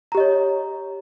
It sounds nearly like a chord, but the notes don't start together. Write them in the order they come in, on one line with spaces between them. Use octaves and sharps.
A#5 G4 D#5 C#5